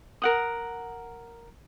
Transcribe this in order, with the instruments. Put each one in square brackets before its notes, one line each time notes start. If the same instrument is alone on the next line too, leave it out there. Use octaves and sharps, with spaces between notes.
[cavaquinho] A#4 F#5 D#6